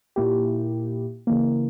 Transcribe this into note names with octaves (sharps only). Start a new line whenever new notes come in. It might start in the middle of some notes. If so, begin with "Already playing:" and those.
A#2 A#3 E4 G4
C#3 E3 A#3